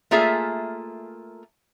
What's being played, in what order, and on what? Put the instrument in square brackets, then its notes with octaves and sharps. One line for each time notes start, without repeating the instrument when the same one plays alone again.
[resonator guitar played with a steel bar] A3 A#3 F4 G#4 E5 G#5